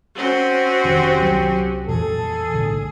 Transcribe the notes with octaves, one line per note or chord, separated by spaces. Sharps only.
C4 C#4 F#4
F1 D#3 G4
C2 F3 F#3
F2 A#2 E3 G#4 A4
B1 A2 D3